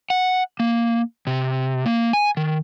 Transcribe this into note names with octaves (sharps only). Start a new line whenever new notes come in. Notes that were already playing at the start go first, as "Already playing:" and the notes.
F#5
A#3
C3
A#3
G#5
D#3